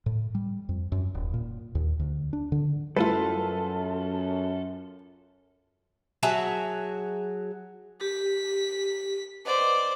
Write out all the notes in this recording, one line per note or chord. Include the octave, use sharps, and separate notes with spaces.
A2
G3
F2
F#2
D#1
A#2
D#2
D2
D4
D3
F#2 G3 A3 E4 F4 A4 B4
F#3 G#4 E5 A5
G4 B6
B4 C5 D5 D#5 F#5